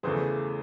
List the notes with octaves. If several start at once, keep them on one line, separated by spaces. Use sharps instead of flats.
E2 C#3 E3 A3 G#4 C5